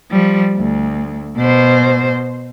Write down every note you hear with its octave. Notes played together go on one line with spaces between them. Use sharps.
F3 G3
D2
B2 C5